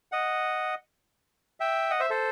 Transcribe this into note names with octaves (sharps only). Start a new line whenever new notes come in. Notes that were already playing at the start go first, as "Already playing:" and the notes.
D#5 F#5
E5 G5
D#5 F#5
C5 E5
A4 C5